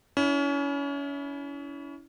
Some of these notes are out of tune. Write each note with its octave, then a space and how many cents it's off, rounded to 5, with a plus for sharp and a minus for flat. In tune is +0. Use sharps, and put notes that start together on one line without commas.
C#4 +30 E4 -15